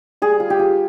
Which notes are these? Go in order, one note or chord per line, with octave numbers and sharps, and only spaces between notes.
G3 G#4
F4
G4
F4